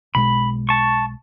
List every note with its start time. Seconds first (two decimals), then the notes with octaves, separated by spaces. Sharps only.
0.15 B1 B2 G#3 B5
0.69 A5 C#6